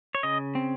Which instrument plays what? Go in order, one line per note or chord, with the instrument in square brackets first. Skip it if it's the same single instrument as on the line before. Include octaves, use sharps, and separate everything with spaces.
[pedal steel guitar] C#5
C#3 D#5
C4